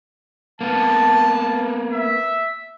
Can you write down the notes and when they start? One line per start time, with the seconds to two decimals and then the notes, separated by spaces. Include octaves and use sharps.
0.61 A#3 B3 A5
1.92 E5